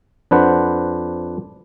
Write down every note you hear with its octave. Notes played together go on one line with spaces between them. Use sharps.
F2 D4 B4 C5 F#5